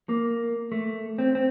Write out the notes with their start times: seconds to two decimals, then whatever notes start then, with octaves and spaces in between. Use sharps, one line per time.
0.09 A#3
0.72 A3
1.18 C4
1.35 C4